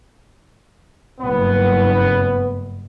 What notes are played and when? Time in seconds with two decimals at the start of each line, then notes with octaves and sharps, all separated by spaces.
1.20 F#1 G2 B3